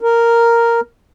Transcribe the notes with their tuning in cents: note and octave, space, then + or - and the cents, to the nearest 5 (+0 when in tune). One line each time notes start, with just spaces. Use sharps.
A#4 -5